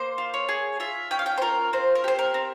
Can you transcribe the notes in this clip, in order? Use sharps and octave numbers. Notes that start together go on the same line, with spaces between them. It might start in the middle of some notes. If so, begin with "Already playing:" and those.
Already playing: A#3 C5
F4
C#5
G#4
F4 E5
C#4 G5
F5
G5
C5
F4 A#4
C4 C5
A#4
G4 C5
A#4
C4